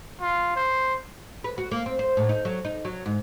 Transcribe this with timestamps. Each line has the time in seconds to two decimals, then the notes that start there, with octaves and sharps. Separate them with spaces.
0.22 F4
0.56 C5
1.44 B4
1.58 F#4
1.71 A#3
1.86 C4
1.99 C5
2.17 A2
2.29 D#4
2.45 F#3
2.65 D#4
2.85 F#3
3.06 G#2